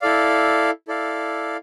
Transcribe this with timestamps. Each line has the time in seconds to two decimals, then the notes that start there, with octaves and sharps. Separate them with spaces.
0.02 E4 A4 D5 F5
0.88 E4 A4 D5 F5